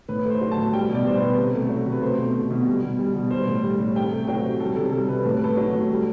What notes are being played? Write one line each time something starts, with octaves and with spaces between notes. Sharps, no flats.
A2 B4
A3 C5
F#3
A5
A2
G3 G5
B2
D5
G3 C5
B4
B2
C3
A3
F#3
C3
B4
A3 C5
B2
A3
B2
G3
B2
G3
B2
G3 C5
A2
G3
A2
C3 G5
A3
F#3 G5
C3
G3 A4
C3 A4
G3 A4
C3 B4
A2 A4
B4
A3 A4
F#3
A2
G3